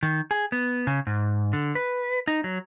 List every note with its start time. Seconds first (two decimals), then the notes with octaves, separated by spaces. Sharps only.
0.03 D#3
0.31 G#4
0.52 B3
0.87 C#3
1.07 G#2
1.53 D3
1.75 B4
2.28 D#4
2.44 F#3